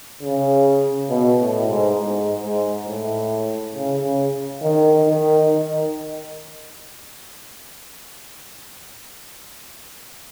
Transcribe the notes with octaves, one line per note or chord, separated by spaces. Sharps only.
C#3
B2
A2
G#2
G#2
G#2
A2
C#3
C#3
D#3
D#3
D#3